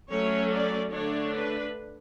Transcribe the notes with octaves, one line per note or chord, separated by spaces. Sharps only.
F#3 A3 C#4 C#5
D5
D3 A3 D4 C#5
B4